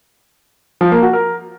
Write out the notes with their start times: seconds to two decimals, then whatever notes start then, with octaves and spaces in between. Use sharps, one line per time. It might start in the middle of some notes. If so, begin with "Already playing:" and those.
0.81 F3
0.92 A#3
1.02 F#4
1.13 A#4